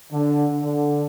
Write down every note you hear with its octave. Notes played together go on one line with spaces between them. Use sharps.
D3
D3